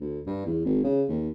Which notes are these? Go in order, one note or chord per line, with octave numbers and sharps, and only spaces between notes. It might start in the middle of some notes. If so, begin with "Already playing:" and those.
D2
G2
E2
G#1
C#3
D#2